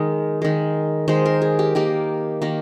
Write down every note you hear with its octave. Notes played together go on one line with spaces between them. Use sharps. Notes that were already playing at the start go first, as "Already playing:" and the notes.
Already playing: D#3 G#3
D#3 G#3
D#3 G#3 C5
A#4
G#4
G4
D#3 A#3 G4
D#3 A#3